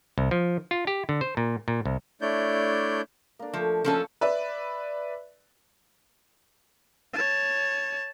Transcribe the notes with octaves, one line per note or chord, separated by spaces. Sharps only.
C2
F3
F4
G4
D3
C5
A#2
A#2
C2
A3 D4 E4 C#5 D5 G6
A#3 D4
F3 A3
F3 A#3 C#4 A4 C#5 F#5
B4 D5 E5
C#5 A5